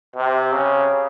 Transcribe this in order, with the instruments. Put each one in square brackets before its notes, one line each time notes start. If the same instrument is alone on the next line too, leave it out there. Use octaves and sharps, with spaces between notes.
[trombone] C3
C#3